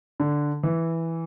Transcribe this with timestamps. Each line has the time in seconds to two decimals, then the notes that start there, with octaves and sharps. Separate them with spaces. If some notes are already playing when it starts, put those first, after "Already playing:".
0.20 D3
0.63 E3